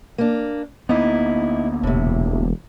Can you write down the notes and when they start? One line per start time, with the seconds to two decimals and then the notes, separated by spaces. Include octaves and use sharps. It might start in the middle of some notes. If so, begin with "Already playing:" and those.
0.18 A#3 D4
0.89 D2 A#3 B3 D#4 E4
1.83 E1 A2 C3